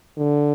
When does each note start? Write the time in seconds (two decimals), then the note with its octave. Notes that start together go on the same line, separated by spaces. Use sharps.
0.18 D3